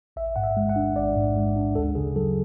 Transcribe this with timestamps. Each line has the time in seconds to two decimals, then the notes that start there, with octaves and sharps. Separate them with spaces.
0.16 A1 E5
0.36 G#2 F#5
0.43 E5
0.57 G#3
0.69 F#5
0.76 D4
0.96 A1 D5
1.16 G#2
1.36 G#3
1.56 D4
1.75 D2 A4
1.95 C#3 G#4
2.16 F#3 A4